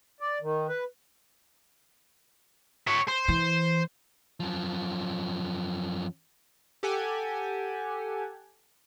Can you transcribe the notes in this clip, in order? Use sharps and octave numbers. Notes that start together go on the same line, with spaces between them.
D5
D#3
B4
C#5 E5
C5
E3
F#2 F3
G4 A4 F#5 G#5